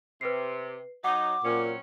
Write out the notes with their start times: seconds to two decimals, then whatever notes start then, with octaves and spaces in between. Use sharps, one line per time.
0.21 C3 B4 C7
1.04 F#3 D#4 F#5 D6
1.44 A#2 F#3 C4 C#4